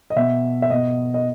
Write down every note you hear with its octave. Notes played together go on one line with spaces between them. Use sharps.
D#5
B2 E5
E5
B2 D#5
D#5